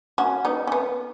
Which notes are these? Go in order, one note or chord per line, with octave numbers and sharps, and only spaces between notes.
C#4 F#4
B3 D#4
C#4
B3